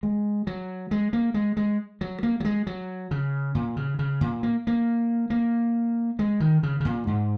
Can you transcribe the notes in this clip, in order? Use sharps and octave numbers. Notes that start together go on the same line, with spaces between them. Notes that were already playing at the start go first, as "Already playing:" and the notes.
G#3
F#3
G#3
A#3
G#3
G#3
F#3
A#3
F#3
G#3
F#3
C#3
A#2
C#3
C#3
A#2
A#3
A#3
A#3
G#3
D#3
C#3
C#3
A#2
G#2